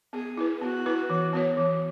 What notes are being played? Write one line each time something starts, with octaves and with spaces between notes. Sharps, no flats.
B3 G#4
E4 B4
B3 F#4
E4 B4
E3
B3 F#4 C#5
E3